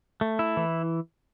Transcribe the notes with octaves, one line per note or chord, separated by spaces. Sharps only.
A3
E4
E3